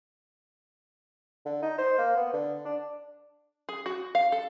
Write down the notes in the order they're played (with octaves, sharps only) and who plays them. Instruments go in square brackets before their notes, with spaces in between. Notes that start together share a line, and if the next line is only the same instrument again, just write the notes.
[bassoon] D3
D#4
C5
A#3
B3
D3
D4
[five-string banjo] G#4
F#4
F5
A4